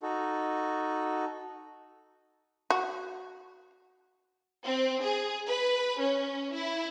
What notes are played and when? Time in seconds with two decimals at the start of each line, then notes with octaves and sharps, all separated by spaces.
0.03 D#4 F#4 A4
2.70 F#4
4.64 C4
5.02 G#4
5.47 B4
5.99 C#4
6.54 E4